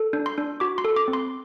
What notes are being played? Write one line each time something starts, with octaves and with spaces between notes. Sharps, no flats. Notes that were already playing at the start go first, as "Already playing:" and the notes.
Already playing: A4
D4
C6
D4
F#4 D6
C6
A4
D6
C4
C6